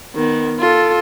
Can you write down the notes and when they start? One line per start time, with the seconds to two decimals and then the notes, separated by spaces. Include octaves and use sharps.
0.16 D#3 B3
0.59 F4 A4